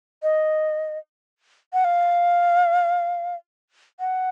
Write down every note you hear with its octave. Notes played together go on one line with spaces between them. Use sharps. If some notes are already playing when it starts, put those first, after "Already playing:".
D#5
F#5
F5
F#5